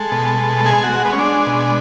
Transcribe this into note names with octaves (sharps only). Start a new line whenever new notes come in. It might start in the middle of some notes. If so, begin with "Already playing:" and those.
Already playing: G#3 A4
B2
G#3
G#3 G#4
F#4
G#3
B3
C#4
G#3 D4
B2